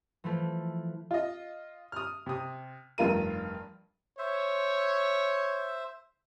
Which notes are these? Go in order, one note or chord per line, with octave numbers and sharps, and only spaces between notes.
E3 F3 A3
F4 D#5
D#6 F6
C3 D#6
F1 G2 F4 A#4 D#7
C5 C#5 E5